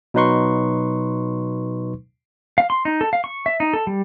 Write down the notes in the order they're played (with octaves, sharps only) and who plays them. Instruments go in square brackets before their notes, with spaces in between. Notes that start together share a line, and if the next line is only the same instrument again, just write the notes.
[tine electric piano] B2 F#3 D#4 B4 C6 C#6
[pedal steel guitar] F5
C6
D#4
A4
F5
C#6
E5
D#4
A4
G3